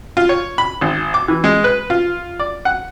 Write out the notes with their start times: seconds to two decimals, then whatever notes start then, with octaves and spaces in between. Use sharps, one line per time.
0.17 F4
0.29 C#5
0.58 B5
0.81 G#1
1.14 D6
1.28 E3
1.44 G#3
1.64 B4
1.90 F4
2.39 D5
2.65 F#5